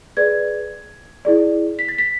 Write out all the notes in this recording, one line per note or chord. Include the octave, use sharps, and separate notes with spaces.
G#4 B4 D5 G#6
E4 G#4 D5
B6
A6
B6